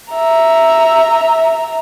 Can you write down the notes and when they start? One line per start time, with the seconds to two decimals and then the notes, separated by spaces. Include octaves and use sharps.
0.12 E5 A#5